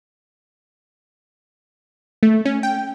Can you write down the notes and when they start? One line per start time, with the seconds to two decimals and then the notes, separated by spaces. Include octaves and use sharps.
2.23 A3
2.45 C#4
2.63 G5